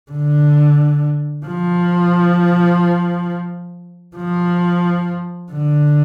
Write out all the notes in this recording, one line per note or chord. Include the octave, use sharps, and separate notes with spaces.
D3
F3
F3
D3